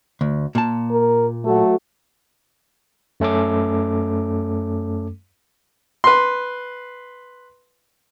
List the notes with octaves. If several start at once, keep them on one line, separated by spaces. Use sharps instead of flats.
D2
A#2 A5
A#4
F#3 A3 F#4 A4
F#2 A3 C#4 A4 D6
B4 C6